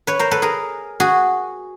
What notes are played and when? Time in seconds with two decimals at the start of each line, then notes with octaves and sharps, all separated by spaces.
0.07 B4 C#5
0.19 A#4 C5
0.31 A4 B4
0.42 G#4 A#4
1.00 F#4 G#4